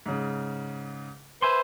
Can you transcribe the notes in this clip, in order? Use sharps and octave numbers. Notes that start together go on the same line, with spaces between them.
G#2 C#3
B4 C5 E5 G#5 C6